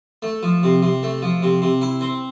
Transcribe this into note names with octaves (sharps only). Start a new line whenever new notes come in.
A3
F3
C3
C3
A3
F3
C3
C3
E4
C4